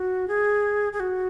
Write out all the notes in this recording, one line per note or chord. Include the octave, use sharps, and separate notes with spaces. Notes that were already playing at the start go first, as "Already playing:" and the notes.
Already playing: F#4
G#4
G#4
F#4